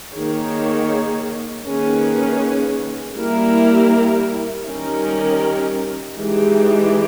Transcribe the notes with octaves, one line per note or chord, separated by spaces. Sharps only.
D#3 A#3 D#4 G#4 C#5
D#3 A#3 C#4 G#4 B4
G3 A#3 E4 G4 A#4
D#3 G3 C#4 G4 A#4
E3 G#3 D#4 G4